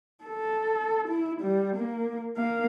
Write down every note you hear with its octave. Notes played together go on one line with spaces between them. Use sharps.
A4
E4
G3
A#3
A#3 F5